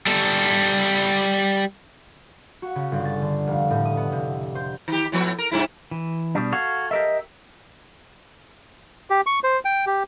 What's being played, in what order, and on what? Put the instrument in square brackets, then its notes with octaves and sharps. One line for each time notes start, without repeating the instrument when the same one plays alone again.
[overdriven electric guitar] G3 A4
[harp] F#4
C#3
G1
A6
D3
F1
A2
D#6
B3
C3
C5
[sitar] D#3 G4
A2 F3 B3
A#4
G2 C3 E4
[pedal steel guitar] E3
[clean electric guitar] B2 G3 D4
[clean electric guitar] F#4 [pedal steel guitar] A4 F5 [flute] G#6
[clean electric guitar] G4 A#4 E5 [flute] D#5
[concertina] G4
C#6
C5
G5
G4